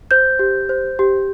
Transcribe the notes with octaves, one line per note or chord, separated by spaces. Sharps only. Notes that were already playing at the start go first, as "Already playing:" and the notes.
C5 G6
G4
C5
G4